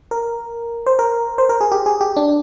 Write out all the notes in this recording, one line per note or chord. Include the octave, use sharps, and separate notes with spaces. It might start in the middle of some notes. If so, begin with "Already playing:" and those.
A#4
C5
A#4
C5
A#4
G#4
G4
G#4
G4
D4